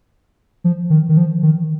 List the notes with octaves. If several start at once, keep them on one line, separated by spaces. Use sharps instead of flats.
F3
D#3
D#3
F3
D#3